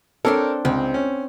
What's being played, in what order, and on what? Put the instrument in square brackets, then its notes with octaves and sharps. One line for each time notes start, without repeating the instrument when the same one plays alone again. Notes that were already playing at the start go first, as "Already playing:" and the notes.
[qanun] C4 D4 C6 [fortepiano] A4 A#4 C#5
[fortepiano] C#2 [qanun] C4
[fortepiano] C#4